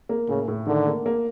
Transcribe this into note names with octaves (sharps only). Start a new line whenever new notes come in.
A#3
A2 C#3
A2
D3 D#3
A#3
A#3